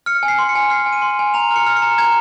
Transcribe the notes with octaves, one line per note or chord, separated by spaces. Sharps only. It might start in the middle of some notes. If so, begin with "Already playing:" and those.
F6 C#7
G#5
C7
C6
C#7
G#5
F6 C7
G#5
D#7
C6
G#5
A#5 F7
F6 C#7
F6
C#7
A#5
A#5 G#6